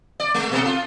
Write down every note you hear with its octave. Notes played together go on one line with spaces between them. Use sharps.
D5
G#3
B2 B3 A4
F4